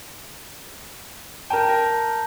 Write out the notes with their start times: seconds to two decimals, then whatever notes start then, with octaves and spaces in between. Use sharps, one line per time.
1.50 A#4 G5 A5 A#5 G6
1.69 A#4